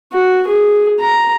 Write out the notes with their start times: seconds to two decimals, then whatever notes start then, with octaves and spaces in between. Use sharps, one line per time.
0.13 F#4
0.47 G#4
1.00 A#5